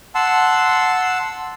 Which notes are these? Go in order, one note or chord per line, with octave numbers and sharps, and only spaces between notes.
F#5 A5 C6 E6